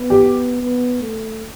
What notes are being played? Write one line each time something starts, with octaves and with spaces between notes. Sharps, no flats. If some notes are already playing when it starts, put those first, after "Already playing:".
Already playing: B3
G4
B3
A3